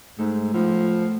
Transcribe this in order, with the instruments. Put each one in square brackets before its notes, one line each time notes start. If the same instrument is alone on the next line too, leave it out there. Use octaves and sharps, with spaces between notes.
[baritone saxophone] G#2 [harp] G#3 A3
[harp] A2 B3 [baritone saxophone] F3